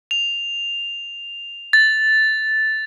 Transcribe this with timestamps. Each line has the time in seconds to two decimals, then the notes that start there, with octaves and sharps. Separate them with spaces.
0.11 F7
1.73 A6